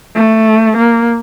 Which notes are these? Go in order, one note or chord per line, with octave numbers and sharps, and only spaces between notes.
A3
A#3